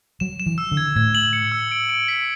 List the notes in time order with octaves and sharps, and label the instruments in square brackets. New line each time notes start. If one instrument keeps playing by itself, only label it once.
[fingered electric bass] F#3 [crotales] E7
[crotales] E7
[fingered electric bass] E3
[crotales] E6
[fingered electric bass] D3
[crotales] G#6
[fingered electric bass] A2 [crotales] G#6
[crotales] F#7
C#7
E6
D7
D7
B6